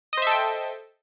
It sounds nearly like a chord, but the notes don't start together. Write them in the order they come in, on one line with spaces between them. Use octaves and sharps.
D#5 C5 E5 A4 G5